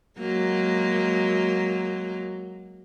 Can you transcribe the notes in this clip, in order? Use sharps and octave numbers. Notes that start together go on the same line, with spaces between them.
F#3 G#3 A#3